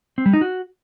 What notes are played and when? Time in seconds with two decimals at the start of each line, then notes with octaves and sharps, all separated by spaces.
0.18 C4
0.26 G3
0.33 D#4
0.41 F#4